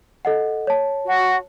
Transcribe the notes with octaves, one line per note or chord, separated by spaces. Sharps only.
A4 D#5 F#5
C#5 A5
F#4